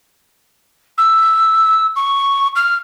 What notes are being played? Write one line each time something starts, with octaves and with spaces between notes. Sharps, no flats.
E6
C#6
F6